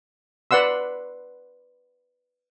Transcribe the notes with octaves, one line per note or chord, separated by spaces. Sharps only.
B4 D5 F#5 C6 E6